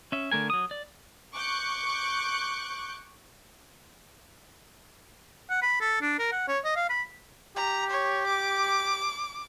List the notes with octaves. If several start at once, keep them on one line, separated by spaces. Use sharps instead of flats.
C#4 E5
D3 A3 A#4 G#5
F#3 D#6
D5
C#6 D6 F#6 G6 C#7
F#5
B5
A4
D4
A#4
F#5
C#5
D#5
F5
B5
G4 A#5
C#5
D6